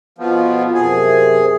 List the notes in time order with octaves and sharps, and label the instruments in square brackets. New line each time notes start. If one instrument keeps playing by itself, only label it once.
[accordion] F2 B2 F3
[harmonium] F#2 C3 [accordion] G#4